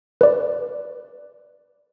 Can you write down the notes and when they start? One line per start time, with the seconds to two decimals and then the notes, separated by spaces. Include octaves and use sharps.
0.21 B4 D5